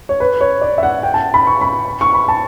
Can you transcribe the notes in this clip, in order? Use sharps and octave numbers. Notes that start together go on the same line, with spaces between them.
C#5
B4
C#5
D5
E5
F#5
G5
A5
B5
C#6
B5
C#6
B5
A5